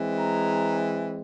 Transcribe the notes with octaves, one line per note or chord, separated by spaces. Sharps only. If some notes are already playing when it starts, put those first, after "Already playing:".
Already playing: E3 G#3 C4
A#5